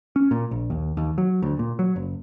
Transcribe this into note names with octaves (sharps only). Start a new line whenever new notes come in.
C#4
A#2
A#1
D#2
D#2
F#3
D2
A#2
F#3
F#1